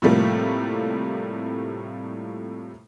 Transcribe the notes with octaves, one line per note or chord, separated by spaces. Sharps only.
A2 C3 F3 G3 A3 A#3